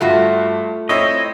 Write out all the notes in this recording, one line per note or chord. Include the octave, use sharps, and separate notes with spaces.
G2 A3 F4 F#4
C4 E4 C#5 D#5